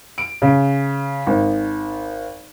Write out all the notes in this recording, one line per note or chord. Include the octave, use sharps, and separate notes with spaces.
D7
C#3
G#1